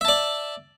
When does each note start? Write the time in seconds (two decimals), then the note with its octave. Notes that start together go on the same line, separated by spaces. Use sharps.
0.01 E5
0.05 A5
0.08 D5